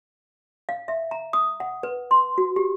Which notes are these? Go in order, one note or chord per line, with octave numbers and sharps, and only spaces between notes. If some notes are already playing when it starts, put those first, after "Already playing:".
F5
E5
A#5
D#6
F#5
B4
C6
F#4
G4